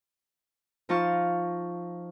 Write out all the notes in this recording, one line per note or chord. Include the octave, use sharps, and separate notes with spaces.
F3 D#4 F4 A5 C#6 F6